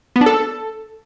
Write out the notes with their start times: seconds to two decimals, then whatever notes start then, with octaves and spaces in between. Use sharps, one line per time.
0.16 B3
0.21 D4
0.26 A4